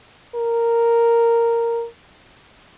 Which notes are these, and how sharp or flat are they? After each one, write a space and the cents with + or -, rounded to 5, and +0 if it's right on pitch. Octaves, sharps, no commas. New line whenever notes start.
A#4 -5